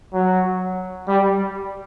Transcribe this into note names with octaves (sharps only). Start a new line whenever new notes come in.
F#3
G3